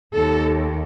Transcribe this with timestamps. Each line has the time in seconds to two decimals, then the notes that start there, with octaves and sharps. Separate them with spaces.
0.14 D#2 A4